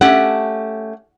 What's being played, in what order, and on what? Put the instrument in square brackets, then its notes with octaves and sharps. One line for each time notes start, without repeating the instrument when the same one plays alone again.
[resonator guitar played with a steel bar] A3 C#4 G4 [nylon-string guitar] F#5